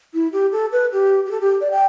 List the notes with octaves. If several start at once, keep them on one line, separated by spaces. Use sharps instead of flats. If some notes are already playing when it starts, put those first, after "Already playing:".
E4
G4
A4
B4
G4
G4
A4
G4
D5
G5